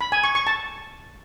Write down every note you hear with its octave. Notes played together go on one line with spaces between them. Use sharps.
B5
G#5
C#6
C#6
A5